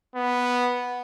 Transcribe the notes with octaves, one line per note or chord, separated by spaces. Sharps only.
B3